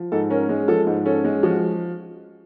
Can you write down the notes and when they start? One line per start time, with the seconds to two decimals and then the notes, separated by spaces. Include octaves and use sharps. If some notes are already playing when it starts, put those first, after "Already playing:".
Already playing: F3
0.12 G#2 A4
0.30 C#4 A#4
0.49 G#3
0.68 F3 A4
0.87 G#2
1.05 C#4 A4
1.24 G#3
1.43 F3 F#4